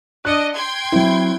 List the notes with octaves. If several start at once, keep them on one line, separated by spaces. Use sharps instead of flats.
D4 D#5 F#6 C#7
G5 C6 G#6
F#3 C4 E4